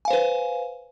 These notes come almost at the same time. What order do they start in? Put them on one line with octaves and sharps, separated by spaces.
G#5 F5 C5 B4